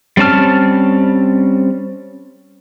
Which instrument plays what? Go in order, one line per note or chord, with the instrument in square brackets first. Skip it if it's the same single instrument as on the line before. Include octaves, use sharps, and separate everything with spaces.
[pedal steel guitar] G3 C4 C#4 A5 F6